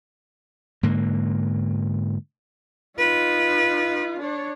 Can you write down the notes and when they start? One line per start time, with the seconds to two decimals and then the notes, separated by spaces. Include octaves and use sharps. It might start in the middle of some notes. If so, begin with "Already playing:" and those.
0.83 G#2 D3 A#3
2.98 D#4 F4 B4
4.19 D4 C#5